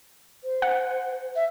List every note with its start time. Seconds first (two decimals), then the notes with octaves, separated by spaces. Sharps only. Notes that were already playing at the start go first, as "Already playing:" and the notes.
0.44 C5
0.62 F#5
1.35 E5